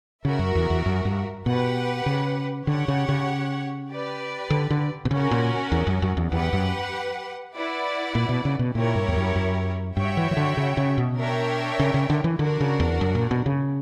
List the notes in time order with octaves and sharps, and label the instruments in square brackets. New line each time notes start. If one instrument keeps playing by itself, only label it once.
[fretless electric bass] C#3 [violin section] F#4 A#4 E5
[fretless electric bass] F#2
E2
E2
F#2
G2
[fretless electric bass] B2 [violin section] G4 B4 F#5
[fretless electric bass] C#3
[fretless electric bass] D3 [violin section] G4 C#5 F#5
[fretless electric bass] C#3
C#3
[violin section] G4 B4 D5
[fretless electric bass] D3
D3
B2
[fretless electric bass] C#3 [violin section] C#4 F#4 A#4
[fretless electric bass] A#2
E2
F#2
F#2
E2
[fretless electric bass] E2 [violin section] G4 B4 F#5
[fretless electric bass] F#2
[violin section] E4 B4 D5 F#5
[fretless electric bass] A#2
B2
C#3
B2
[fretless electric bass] A#2 [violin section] E4 G4 A#4 C#5
[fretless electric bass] G2
E2
F#2
F#2
[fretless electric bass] G2 [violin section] F#4 C#5 E5 G5
[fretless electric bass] E3
E3
D3
C#3
C#3
B2
[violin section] D4 A#4 C#5 E5 G5
[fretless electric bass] C#3
C#3
D3
E3
[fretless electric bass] D3 [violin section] D4 F#4 A#4
[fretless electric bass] C#3
E2
F#2
A#2
B2
C#3